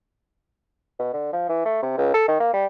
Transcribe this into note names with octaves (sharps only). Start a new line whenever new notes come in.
B2
D3
F3
E3
A3
C3
C#2
A4
D#3
A#3
G3